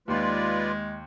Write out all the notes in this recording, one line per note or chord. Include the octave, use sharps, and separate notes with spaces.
D#2 G#3 F4 B4 D5 C6